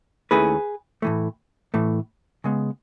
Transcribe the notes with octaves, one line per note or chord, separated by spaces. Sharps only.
D#2 D#3 A3 C#4 E4 G#4 B4
A2 E3 A3
A2 E3 A3
C#3 G#3 B3